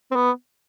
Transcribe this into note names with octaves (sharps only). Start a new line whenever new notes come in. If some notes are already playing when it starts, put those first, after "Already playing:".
C4
B3